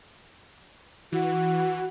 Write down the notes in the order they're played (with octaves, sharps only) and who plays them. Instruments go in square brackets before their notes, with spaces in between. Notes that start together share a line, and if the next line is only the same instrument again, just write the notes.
[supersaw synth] E3 [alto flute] F#4